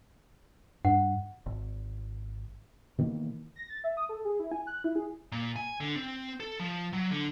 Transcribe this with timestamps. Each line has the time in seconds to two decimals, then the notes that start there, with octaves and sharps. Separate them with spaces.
0.85 G2 F#5
1.46 G#1
2.98 B2 D#3 E3 A#3
3.56 A#6
3.70 A6
3.84 E5
3.97 D#6
4.09 A4
4.25 G#4
4.40 E4
4.52 G#5
4.67 F#6
4.84 E4
4.96 G#4
5.32 A#2
5.56 G#5
5.80 D3
5.96 C4
6.40 A4
6.60 F3
6.93 F#3
7.11 D3